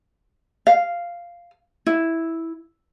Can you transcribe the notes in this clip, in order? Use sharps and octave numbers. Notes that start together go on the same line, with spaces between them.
F5
E4